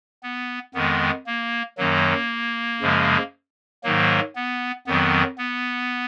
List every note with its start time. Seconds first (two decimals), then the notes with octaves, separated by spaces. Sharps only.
0.23 B3
0.74 F2 D#3 G#3 B3
1.26 A#3
1.78 F#2 D#3 F#3 A#3
2.81 F#2 C#3 F3 G#3
3.83 G#2 D#3 F#3 A#3
4.36 B3
4.87 F2 D#3 F#3 B3
5.38 B3